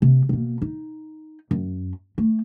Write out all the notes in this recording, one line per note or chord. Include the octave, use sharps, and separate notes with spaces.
C3
B2 A#3
D#4
F#2
A3